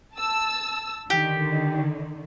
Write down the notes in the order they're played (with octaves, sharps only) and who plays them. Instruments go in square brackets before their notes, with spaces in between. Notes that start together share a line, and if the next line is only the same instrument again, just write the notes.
[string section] A5 E6
[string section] D3 D#3 [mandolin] G4